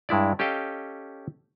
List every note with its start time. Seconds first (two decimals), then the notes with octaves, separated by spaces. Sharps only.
0.09 G2 G#3 E4 D5
0.39 C#4 G4 A4 D#5 F5 G5